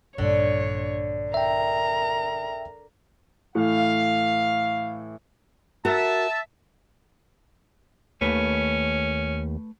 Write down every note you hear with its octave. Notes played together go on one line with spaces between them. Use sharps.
A#1 G2 A#2 D3 C#5
A#4 E5 G5 A#5
A2 E3 A3 F5
F#4 A#4 E5 A5
D#2 A3 C#4 B4